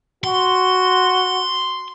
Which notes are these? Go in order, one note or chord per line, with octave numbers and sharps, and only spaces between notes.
F#4 C6